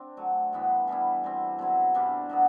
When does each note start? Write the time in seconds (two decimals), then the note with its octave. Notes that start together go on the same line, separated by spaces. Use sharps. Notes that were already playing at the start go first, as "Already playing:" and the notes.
Already playing: C4 D4
0.17 D3 F#3 A3
0.53 G2 E3 B3
0.88 E3 G3 B3 E4
1.24 B2 G3 C4
1.59 B2 F#3 C4 E4
1.94 G2 E3 G3 D4
2.29 B2 F#3 B3